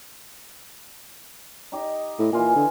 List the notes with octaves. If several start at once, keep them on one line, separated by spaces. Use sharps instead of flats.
D#4 G4 D#5
A2
A#2 E3 F4 G#5
D3